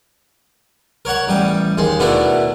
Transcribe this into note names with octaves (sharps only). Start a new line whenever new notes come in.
A#4 C#5 F#5 C#6
A1 G3 G5 D#6
D#2 G#3 C6
B2 A3 B3 D4 E4 A#4